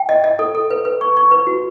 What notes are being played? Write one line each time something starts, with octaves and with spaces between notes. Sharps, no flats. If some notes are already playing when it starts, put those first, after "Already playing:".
Already playing: G5
D#5
D#5
A4
A4
B4
B4
C#6
C#6
B4
F#4